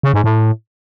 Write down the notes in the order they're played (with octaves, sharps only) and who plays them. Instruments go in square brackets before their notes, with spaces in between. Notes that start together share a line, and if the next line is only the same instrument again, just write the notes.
[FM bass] C#3
G#2
A2